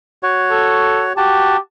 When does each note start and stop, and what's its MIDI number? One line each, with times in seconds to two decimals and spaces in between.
0.23 1.13 66
0.23 1.13 73
0.51 1.05 69
1.17 1.57 66
1.17 1.57 67
1.17 1.57 81